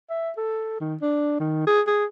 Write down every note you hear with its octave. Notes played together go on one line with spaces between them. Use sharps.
E5
A4
D#3
D4
D#3
G#4
G#4